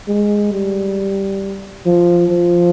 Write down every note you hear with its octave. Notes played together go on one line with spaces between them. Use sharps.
G#3
G3
F3
F3